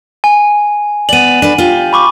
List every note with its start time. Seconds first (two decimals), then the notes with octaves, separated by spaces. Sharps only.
0.24 G#5
1.09 B3 D5 D#7 F#7
1.42 D4 A4 B4
1.58 F4 G4
1.93 B5 C#6 D6